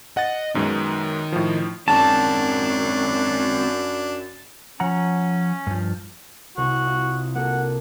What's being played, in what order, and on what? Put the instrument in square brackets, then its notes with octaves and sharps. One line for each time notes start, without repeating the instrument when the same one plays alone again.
[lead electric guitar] D#5 [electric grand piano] F#5 A6
[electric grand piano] F#2 B2 G#3 [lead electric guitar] D#3 D#4
[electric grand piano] A2 F3
[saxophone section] F#2 [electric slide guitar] G#3 C4 D#4 [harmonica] D4 [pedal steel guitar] A5
[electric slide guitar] F3 F#5 A#5 [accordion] C#4
[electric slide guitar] G2 F3
[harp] C2 [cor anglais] F#4
[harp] D#4 F4
[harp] A#3 F#4 A4 [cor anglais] F#5